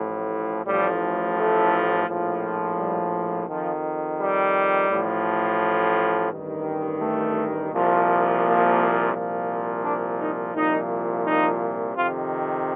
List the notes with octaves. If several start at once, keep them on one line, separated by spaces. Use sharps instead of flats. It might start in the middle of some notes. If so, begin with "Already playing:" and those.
Already playing: A1 A2 F3
A1 A2 F3 G3
A3
A#1 A2 F3
G3
F2 D#3 F3
G3
A1 A2 F3
A1 G2 D#3
A3
C2 A#2 F3
A#3
C2 A#2 F3
D4
D#4
C2 A#2 F3 D#4
D#4
F2 C3 D#3 F4